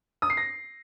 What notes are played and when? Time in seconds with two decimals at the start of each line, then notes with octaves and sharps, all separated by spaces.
0.22 D#6
0.30 C7
0.37 A#6